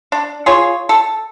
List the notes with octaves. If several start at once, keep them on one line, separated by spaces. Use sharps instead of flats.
D4
F4 G#4 C#5
A4